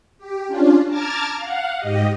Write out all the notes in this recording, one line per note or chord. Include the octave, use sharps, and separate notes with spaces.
G4
C#4 D4 F4
A5 A#5 D6 F6 G#6 A6
F5 F#5
G#2 G4 D#5